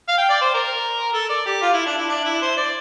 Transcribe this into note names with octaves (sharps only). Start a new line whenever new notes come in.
F5
G5
D5
C5
A#4
A4
D5
G4
F4
E4
D4
E4
D4
E4
C5
D5